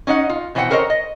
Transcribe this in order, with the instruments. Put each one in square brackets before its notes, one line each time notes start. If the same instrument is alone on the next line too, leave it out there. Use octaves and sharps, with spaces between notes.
[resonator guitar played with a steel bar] C#4 D#4 D#5 F#5
F4
B2 E3 C5 C#5 F#5 G5
A4 A#4 C5 C#5 D#5 A#5
D#5